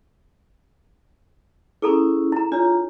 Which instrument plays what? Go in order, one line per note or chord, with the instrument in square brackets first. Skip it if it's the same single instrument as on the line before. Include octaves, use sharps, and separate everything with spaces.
[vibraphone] C#4 E4 [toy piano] G#4 A4 A#5
[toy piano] E4 A#5
[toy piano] D4 C#5 [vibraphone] F4 A#5